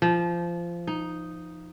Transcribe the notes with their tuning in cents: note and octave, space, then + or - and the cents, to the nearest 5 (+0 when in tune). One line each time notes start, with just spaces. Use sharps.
F3 -20
D#4 +0